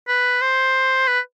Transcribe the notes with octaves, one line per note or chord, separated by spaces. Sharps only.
B4
C5
B4